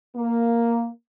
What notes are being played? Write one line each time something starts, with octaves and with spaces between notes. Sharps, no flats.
A#3